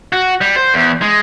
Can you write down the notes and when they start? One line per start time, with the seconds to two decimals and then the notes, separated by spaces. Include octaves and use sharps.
0.12 F#4
0.41 G3
0.56 C5
0.74 E2
1.02 G#3